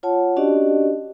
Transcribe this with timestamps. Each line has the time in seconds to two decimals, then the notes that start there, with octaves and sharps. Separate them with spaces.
0.03 F4 C#5 F#5 A5
0.36 C#4 D4 F#4 G4 D5 D#5